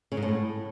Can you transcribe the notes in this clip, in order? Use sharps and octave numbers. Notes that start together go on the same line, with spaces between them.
C#3
G#2
A2